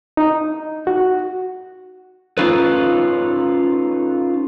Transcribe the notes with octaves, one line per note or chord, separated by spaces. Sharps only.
D#4
F#4
C#4 D#4 F4 A4 B4